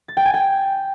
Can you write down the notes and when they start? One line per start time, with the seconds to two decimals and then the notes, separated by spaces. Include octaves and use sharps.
0.08 A6
0.17 G5
0.25 G#5
0.34 G5